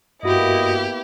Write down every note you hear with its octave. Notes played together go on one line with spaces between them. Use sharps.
G2 A#3 B3 E4 F#4 G4 D#5